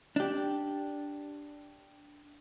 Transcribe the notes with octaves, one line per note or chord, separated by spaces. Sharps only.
D4 G4